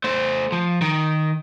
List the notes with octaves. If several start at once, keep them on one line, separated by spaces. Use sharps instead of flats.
A3 C5
F3
D#3